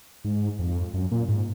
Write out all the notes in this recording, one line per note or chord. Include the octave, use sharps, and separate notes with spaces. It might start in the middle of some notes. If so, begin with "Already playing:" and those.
G#2
F2
F#2
A#2
G#2